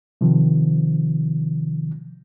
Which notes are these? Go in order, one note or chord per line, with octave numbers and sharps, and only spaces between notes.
C3 D#3 F3